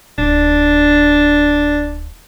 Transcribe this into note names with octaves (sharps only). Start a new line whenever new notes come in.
D1 D4